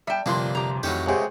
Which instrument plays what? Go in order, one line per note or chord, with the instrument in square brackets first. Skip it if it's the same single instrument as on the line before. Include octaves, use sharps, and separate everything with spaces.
[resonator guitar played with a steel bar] G3 A5 [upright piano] E5 G5
[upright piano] G1 F2 C6 [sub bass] C3 [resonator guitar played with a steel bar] G3 [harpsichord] A#3 D4
[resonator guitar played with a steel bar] G4 A#5
[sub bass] F2 [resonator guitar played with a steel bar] A2 D#3 E3 [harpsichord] F#3 C#4 G4
[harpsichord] C#2 C3 [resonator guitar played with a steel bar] A3 G4 [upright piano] G#4 C#5 F#5